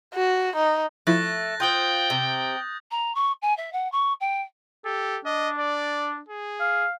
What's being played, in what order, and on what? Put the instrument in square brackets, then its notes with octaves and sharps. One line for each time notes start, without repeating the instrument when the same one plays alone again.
[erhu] F#4
D#4
[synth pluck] F3 E4 [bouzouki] A3 [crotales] F#6 A6 A#6
[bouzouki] F4 G#4 C5 [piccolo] G5 [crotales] D#6 G6
[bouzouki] C3
[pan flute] A#5
C#6
G#5
E5
F#5
C#6
G5
[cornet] G4 [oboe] A4
[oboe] D4 [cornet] D#5
[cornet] D5
G#4
[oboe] F5